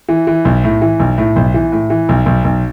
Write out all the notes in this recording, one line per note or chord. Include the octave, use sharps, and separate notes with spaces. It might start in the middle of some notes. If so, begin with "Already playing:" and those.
E3
E3
B1
A2
E3
B1
A2
B1
E3
A2
E3
B1
B1
B1